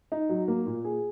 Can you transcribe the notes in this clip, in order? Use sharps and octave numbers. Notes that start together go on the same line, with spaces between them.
D#4
F#3
A#3
A#2
G#4